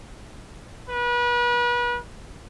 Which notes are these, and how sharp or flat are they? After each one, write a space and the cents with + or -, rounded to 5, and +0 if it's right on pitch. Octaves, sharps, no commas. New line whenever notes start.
B4 -35